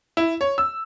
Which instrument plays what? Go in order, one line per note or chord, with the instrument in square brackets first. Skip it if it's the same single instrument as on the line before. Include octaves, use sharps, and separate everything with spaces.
[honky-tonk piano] E4
C#5
E6